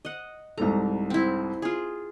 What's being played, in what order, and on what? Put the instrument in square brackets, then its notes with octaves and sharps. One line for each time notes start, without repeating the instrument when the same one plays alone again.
[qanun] D#5 F#5
[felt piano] C2 G#2 A4 [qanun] A#5
[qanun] C4 E4
F4 G#4